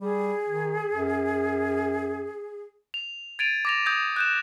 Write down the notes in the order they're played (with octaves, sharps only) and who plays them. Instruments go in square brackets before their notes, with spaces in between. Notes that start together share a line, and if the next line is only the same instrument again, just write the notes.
[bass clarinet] G3 [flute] G#4
[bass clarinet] D#3
F#2
[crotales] F7
G#6 A6 D7 D#7 F7
D6 A#6 F7
D#6 G6 G#6 A#6
F#6 G6 E7